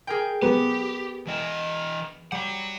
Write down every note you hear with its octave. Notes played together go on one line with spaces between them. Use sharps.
G#4 A#4 G5
B3 G4
E3 D#5
G3 C#5 F#5